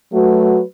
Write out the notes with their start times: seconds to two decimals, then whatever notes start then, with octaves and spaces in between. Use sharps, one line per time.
0.10 F#3 A3 F#4 B4